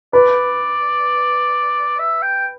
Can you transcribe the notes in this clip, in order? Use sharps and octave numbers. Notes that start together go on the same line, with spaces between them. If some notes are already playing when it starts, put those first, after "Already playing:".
B4 D5
E5
G5